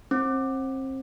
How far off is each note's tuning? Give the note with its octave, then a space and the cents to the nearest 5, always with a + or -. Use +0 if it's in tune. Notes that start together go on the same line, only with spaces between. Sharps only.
C4 +30